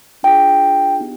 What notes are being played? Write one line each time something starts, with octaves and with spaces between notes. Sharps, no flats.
D4 F4 G#4 G5
B3 D#4 G4